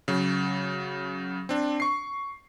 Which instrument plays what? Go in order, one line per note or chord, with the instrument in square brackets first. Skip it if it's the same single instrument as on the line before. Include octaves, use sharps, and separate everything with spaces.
[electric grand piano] C#3 F#3
C4 D4
C#6 C7